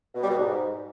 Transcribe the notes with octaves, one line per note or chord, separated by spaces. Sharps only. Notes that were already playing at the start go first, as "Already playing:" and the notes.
B2
G3
B2
G#2